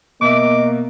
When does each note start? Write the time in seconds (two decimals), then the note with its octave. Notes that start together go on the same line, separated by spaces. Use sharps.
0.22 B2 A#3 D#5 E5 D6